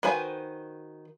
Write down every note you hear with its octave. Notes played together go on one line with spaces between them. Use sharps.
D#3 F#4 B4 C5 G#5